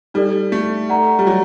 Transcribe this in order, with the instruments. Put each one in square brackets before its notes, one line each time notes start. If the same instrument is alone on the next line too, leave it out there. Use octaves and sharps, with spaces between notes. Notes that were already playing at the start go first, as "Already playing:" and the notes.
[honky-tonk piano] G3 [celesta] D#4 A4 D5
[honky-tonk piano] A3
[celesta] A4 D5 F#5 A#5
[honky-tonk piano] G3
F#3